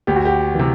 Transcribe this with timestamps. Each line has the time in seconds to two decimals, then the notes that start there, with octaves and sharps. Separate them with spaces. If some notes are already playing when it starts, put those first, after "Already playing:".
0.07 D2 G4
0.16 F#4
0.25 G4
0.55 C3 E3